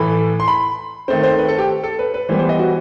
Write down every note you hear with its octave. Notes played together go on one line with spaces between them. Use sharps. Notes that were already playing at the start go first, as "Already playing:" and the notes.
Already playing: A2 E3 A3 B5
C6
B5
D#3 A3 C4 C5
C5
B4
A4
G4
A4
B4
B4
E3 G3 B3 C5
C5
D#5
F#4